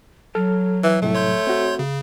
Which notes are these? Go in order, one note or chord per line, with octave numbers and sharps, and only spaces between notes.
F#3 A4 F6
E3
C2 A2 A3
C#5 C6 G6
C4 F#4
C#3